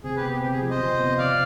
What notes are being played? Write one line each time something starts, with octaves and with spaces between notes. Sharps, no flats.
C3 G#4
G4 B4
B3
G4
C3 G4
G#4
F3
C5 D#5
C3
B3
C3 D5 F5